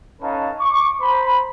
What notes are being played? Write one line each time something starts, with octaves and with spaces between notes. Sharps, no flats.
C#4 D#4 A4 B4 F5 A5
C#6 D6
C5 A#5 B5